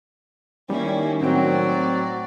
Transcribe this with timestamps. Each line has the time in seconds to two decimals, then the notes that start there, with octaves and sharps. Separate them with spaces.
0.70 D#3 G3 A#3 C#4 E4
1.22 A2 F#3 C4 D5 G5